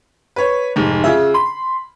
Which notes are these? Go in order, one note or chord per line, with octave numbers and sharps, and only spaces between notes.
B4 C#5
F1 G#2
C#3 F4 G#4 E5
B5 C6